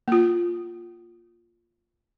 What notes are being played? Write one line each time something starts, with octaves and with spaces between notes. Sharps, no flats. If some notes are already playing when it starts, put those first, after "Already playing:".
A#3 F4